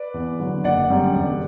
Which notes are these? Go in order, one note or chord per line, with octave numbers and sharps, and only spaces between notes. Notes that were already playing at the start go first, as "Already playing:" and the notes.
Already playing: B4 D5
E2
D3 F#3
F#1 D5 F#5
F#2 D3 G3
E1